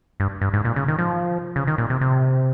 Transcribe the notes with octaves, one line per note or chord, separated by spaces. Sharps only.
G2
G2
G#2
A#2
C#3
D#3
F3
C#3
D#3
A#2
C3
C3